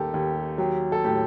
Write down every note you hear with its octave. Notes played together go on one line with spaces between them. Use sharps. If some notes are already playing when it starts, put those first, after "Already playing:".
Already playing: D#2 D#3 G3 G4 A4 A#4
D#2
F#3 G4
A4
A2 G4